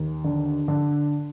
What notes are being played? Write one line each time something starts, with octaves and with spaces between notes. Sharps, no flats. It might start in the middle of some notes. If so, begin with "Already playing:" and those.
Already playing: D#2
D3
D3